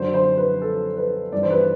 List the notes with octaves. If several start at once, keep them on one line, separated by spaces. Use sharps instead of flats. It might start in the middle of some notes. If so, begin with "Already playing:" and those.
Already playing: F#2 D3 C5
C5
B4
A4
B4
G2 E3 D5
C5
B4